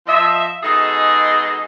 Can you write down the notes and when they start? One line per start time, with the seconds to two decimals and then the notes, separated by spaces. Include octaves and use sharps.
0.07 F3 D#5 E5
0.63 B2 G#3 D#4 G#4 A4 D#5